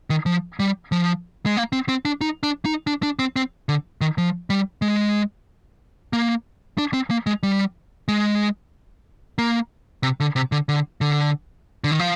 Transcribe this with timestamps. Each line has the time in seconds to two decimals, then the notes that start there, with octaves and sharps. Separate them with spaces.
0.10 D#3
0.26 F3
0.60 G3
0.92 F3
1.46 G#3
1.57 A#3
1.73 C4
1.89 C4
2.05 D4
2.21 D#4
2.43 D4
2.65 D#4
2.87 D4
3.03 D4
3.19 C4
3.36 C4
3.69 D3
4.01 D#3
4.18 F3
4.50 G3
4.82 G#3
6.13 A#3
6.78 D4
6.94 C4
7.11 A#3
7.27 G#3
7.43 G3
8.08 G#3
9.38 A#3
10.03 C3
10.20 D3
10.36 C3
10.52 D3
10.69 D3
11.01 D3
11.84 D3
11.91 D#3
11.99 F3